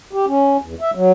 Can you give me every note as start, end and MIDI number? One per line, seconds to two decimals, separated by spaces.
0.13 0.26 67
0.27 0.57 61
0.62 0.74 40
0.81 0.91 76
0.95 1.12 54